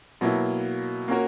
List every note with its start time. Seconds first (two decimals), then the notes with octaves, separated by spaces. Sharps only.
0.21 B2 F#3 A#3 E4
1.08 A#3 C#4 F#4 A#4